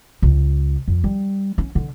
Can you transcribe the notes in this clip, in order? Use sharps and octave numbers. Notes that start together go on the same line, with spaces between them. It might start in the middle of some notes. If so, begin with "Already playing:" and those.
C#2
F2
G3
C#4
D3